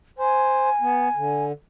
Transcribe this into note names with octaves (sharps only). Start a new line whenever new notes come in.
C5 G#5
B3
D3